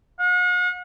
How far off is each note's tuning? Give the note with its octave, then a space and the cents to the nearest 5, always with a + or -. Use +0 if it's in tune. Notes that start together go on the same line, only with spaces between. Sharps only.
F#5 -45